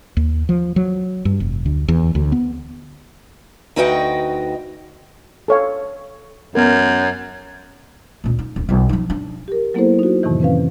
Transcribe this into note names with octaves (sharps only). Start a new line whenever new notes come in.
D#2
F3
F#3
G2
F1
D2
E2
D2
B3
D2 D#4 F#4 B4 D#5 G5
A4 C#5 F5
F#2 B3 A#4
D2 A#2
D#4
D1
B1 F4
F3 D#4
D4
G4 A#4
F#3 A#3 B3 E4 A4 C5
D#4 F#4
F2 A2 C3 D#3 E3
C4 C#4 B4 F5